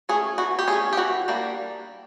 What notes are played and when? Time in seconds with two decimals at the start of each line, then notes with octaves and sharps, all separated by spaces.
0.09 A3 C#4 G#4
0.38 E3 F#4
0.59 G4
0.68 A3 C#4 G#4
0.93 G4
0.97 E3 F#4
1.28 G3 A#3 D4